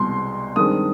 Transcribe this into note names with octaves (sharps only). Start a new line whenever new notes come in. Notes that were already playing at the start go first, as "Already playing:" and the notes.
Already playing: C2 B2 G#3 C6
G2 D#3 G#3 C4 D#6